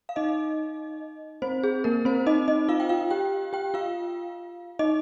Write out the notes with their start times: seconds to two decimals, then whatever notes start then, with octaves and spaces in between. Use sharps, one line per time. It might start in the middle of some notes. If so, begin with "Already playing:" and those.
0.09 F5
0.16 D#4 D#5
1.42 C4 C5
1.63 G#4
1.84 A#3 A#4
2.05 C4 C5
2.26 D#4 D#5
2.48 D#4 D#5
2.69 F4 F5
2.80 G5
2.89 F4 F5
3.10 G4 G5
3.53 G4 G5
3.74 F4 F5
4.79 D#4 D#5